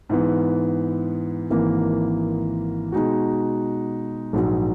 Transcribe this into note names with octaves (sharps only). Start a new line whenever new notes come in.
G#2 E3 B3
G#1 G#2 E3 A#3
B2 G#3 D#4 F#4
A#1 G#2 F#3